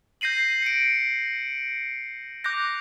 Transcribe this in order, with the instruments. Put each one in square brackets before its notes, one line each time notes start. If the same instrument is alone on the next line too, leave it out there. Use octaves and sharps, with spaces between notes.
[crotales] G6 A#6 C7 D#7 F#7
C#7 D7
D6 F#6 G6 A#6